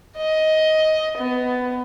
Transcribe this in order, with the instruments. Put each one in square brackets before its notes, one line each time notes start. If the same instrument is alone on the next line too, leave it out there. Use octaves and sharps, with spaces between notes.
[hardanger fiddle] D#5
B3